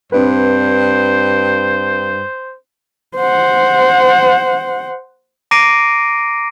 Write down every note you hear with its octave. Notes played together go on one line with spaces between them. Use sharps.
G2 C4 D4 B4 C5
C5 F#5
A#5 D6 A#6 C7 D7 D#7